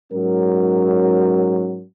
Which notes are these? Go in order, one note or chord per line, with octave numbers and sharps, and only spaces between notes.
G#2 F#3 C#4 A#4